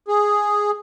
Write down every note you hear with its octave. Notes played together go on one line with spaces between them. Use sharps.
G#4